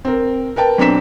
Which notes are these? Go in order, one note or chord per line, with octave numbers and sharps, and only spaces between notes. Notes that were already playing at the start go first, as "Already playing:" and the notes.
C4 A#4
A#4 B4 G5 A5
B1 C4 D4 A#5 B6 E7